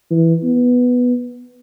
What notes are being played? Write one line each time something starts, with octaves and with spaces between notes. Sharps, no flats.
E3
B3